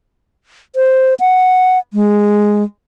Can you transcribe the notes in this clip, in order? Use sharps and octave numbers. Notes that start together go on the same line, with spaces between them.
C5
F#5
G#3